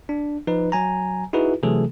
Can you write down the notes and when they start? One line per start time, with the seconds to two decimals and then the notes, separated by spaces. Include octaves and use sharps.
0.09 D4
0.47 F3 D#4 B4
0.72 F#3 G#5 A#5
1.33 D#4 E4 F#4 G#4 B4
1.63 C3 E3 F#3 A3 G#4 A4